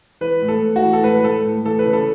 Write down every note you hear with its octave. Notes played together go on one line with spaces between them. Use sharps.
E3 B4
A2
A4
A2
F#4
E3
A4
A2 B4
B4
A3 A4
A2
E3 A4
B4
C#3
A4